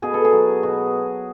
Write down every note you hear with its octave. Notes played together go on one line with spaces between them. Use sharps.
B2 G#4
A4
G#4
F#3
B2 F#4